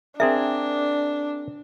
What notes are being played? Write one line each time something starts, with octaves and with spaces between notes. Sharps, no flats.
C4 D4 G#4 A#4 E5